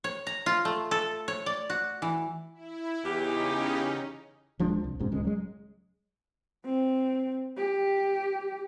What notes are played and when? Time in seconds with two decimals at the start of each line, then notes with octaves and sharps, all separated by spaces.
0.04 C#5
0.27 A#5
0.46 F4
0.65 A3
0.91 A4
1.28 C#5
1.46 D5
1.70 F#4
2.02 E3
2.54 E4
3.05 E2 C#3 C#4 D#4 G4
4.59 D#1 F3 G#3 D4
4.84 C2
4.99 F#1 G#2 B2 C#4
5.12 D1 C#2 G#3 C#4
5.25 F#3 G#3
6.66 C4
7.58 G4